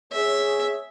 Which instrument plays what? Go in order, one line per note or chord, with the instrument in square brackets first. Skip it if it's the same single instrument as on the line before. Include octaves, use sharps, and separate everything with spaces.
[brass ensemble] G#4 C#5 [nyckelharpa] E5